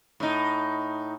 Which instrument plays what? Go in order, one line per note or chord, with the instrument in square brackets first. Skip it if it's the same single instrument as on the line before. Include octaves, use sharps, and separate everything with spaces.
[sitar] A2 D#4